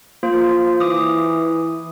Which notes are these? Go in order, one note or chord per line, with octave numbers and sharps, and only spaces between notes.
A#3 F4 C5
E3 D6 D#6